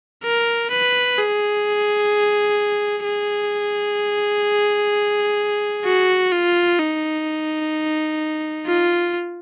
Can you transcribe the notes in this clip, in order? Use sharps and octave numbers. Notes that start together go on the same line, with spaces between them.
A#4
B4
G#4
G#4
F#4
F4
D#4
F4